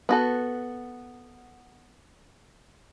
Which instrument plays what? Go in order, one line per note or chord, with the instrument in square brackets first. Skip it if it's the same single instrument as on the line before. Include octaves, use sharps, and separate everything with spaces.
[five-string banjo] B3 F#4 A4